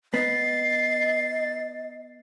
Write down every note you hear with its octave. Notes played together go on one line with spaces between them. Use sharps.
B3 D#5 A6 C7